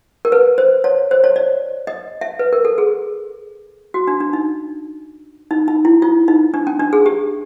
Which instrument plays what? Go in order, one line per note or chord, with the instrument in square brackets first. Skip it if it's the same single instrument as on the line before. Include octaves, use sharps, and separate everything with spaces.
[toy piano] A#4
B4
C5
C#5
C5
C#5
D5
D#5
E5
B4
A#4
A4
G#4
F#4
D4
D4
D#4
D#4
D#4
E4
F4
D#4
D4
C#4
D4
G#4
G4